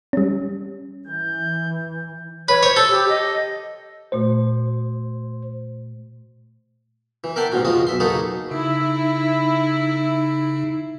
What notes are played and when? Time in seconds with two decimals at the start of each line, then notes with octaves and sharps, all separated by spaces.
0.13 G3 C#4
1.07 E3 G6
2.48 B4 C#5
2.63 C5 C#5
2.76 A4
2.89 G4
3.09 D#5
4.12 A#2 A3 F#4 C5
7.24 E3
7.36 A#4 E5 F#5 G5 A5 C6
7.52 A1 G#2 B2 C#4 F#4
7.65 F3 G#3 F4 F#4 D#5
7.87 B1 E5 C6
8.00 A#3 D#4 F#4 G#4 A4 B4
8.51 C#3 D#4 E4